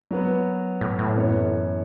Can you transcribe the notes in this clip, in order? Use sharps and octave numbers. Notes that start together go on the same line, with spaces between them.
F#3 B3 F#4 B4
A2
A2
F#2 E3 B3 A4 C#5